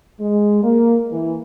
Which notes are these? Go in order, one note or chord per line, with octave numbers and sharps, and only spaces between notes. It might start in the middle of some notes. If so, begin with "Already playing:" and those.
G#3
A#3
E3